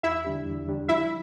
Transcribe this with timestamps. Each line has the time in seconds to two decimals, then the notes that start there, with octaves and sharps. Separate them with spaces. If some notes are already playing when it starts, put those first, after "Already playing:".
0.03 E2 E4 E5
0.25 D3 G3 D4 G4
0.46 E2
0.67 D3 G3 D4 G4
0.88 F3 E4 E5